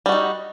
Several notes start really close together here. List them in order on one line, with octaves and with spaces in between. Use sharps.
G3 F#4 D#4